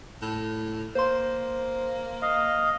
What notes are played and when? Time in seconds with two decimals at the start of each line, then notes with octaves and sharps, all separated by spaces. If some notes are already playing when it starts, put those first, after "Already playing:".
0.22 A2
0.95 A#3 C5 C6
2.22 D#5 F5